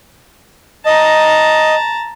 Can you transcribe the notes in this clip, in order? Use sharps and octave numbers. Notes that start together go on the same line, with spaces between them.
D#5 A5 A#5